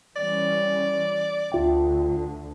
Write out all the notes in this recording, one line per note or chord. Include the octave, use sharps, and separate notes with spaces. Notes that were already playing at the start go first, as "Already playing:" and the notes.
E3 G3 C#4 D5
D2 D3 F4 E5 G5